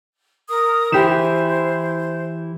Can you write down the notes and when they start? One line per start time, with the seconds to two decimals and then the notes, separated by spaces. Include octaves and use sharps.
0.49 A#4 D#6
0.92 E3 E4 G4 C5 E7